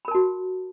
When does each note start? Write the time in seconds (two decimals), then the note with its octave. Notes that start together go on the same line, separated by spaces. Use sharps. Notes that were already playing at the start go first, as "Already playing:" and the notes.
0.05 B5
0.08 A#4
0.11 A5
0.15 F#4